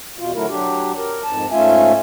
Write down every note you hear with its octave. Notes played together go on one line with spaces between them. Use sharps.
E2 B2 F4
D3 F#3 A3 E4 A#4
F#3 D4 G4
A#4
F2 G#2 A5
G#2 A3 C#4 F4 E5 G#5